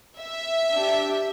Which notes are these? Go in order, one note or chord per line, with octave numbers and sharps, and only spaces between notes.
E5
D4 G4